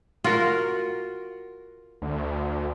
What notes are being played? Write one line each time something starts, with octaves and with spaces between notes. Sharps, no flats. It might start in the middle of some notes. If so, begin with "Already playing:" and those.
F4 F#4 A#4
D2